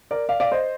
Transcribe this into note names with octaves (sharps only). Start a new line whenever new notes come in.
A#4 D5
D5 F5
D5 F5
C5 D#5